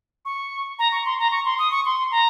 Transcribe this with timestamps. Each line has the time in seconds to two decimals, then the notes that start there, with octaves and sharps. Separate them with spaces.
0.25 C#6
0.79 A#5
0.92 C#6
1.05 C6
1.19 A#5
1.32 C#6
1.45 C6
1.59 D#6
1.71 C#6
1.85 C6
2.11 A#5